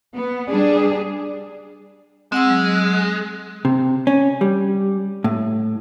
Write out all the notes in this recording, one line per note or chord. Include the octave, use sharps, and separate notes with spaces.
B3
G3 D4 G#4
G#3 C4 F#5 E6
F#3
C3
C#4
G3
A2